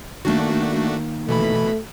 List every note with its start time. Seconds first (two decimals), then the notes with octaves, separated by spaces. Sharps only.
0.25 D#3 A3 A#3 D4 F#4
1.29 B2 E3 A3 B5